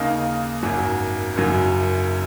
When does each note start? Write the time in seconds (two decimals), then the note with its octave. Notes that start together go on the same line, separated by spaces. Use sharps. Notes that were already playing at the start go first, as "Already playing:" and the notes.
Already playing: D#2 C#3 A#3 D#4 A#4
0.63 G#1 F#2 F#3
1.36 F#1 F#2 F#3